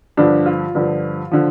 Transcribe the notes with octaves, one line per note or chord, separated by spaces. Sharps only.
G2 D3 F3 D4
F4
G2 D3 F3
D3 F3